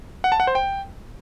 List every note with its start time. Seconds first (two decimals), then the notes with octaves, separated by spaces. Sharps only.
0.24 F#5
0.32 A5
0.40 F#5
0.47 C5
0.55 G5